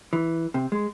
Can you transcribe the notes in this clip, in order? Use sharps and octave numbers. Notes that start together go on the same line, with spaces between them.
E3
C3
G#3